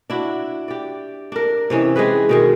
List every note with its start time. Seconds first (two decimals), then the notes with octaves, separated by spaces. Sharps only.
0.10 D4 E4 F#4
0.68 G4 D5
1.32 D4 A#4
1.70 C3 E3 C#4 D#4
1.96 G#3 G4 G#4 B4
2.29 B2 D#3 G#3